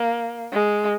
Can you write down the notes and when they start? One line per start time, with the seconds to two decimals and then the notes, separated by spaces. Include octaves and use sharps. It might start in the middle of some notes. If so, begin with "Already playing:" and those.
Already playing: A#3
0.53 G#3